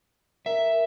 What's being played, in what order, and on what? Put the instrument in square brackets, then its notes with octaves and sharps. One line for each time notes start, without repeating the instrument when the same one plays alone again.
[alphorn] A#4 [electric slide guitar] E5